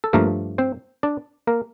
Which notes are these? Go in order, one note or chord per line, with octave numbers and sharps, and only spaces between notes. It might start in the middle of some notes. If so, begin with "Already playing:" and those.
A4
G2 F3 A3 A#3 A#4
C4 C5
D4 D5
A#3 A#4